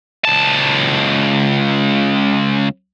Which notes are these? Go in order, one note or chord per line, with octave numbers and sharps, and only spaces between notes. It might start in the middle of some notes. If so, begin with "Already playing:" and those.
C#2 A5